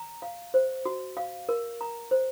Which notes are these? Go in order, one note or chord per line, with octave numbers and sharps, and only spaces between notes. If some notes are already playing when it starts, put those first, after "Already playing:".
Already playing: A#5
F5
C5
F#4
F5
A#4
A#5
C5